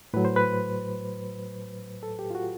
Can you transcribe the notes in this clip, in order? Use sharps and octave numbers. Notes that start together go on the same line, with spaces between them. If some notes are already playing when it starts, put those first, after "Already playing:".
A2 F#3 B4
C5
B4
A4
G4
F4
F#4